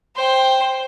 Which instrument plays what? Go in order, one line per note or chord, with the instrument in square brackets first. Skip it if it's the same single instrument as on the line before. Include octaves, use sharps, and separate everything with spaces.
[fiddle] C5 G5